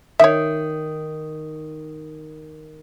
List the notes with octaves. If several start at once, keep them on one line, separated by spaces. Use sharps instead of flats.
D#3 C#5 E5